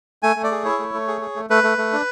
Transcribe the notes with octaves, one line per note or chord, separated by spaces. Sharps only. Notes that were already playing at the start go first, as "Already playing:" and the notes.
A3 G#5
A3
D5
G#4
E4 C#5
A3
A3
G#4
G#4
A3
A3 B4
A3
A3
D4